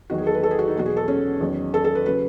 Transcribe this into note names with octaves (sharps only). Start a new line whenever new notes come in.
E2 D#3 F#3 F#4
G#4
A4
B4
A4
G#4
F#4
D#4
E2 B2 F#3 F#4
G#4
A4
C#4
E2 D#3 F#3
A4
A4
B4
C#3 F#3 B4